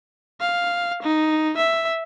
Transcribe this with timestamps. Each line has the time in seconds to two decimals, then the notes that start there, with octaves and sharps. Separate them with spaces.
0.41 F5
1.02 D#4
1.57 E5